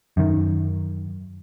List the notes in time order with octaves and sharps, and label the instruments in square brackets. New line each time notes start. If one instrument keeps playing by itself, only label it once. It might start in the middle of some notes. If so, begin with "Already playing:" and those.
[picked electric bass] F#2 D#3